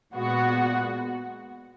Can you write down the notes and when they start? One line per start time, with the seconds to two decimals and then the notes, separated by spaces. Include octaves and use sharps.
0.15 A#2 G#3 B3 F#4